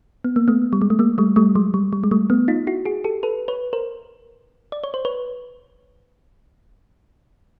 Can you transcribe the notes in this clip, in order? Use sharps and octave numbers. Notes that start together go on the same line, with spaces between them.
B3
A#3
A3 B3
G3
G#3
A3
G#3 A#3
G3 A3
G3 A3
F#3 G#3
G3
G3
G#3
G3 A3
A3 B3
D#4 F4
E4 F#4
F#4 G#4
G4 A4
A4 B4
B4 C#5
A#4 C5
D5
C#5
C5
B4 C#5